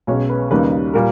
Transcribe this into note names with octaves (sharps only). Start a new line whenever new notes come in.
B1 B2 G#3 C#4 C#5
B4
D#2 C#3 G3 A#3 D#4 B4
A#2 G3 A#4